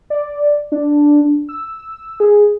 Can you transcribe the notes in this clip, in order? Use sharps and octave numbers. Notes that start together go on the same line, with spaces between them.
D5
D4
E6
G#4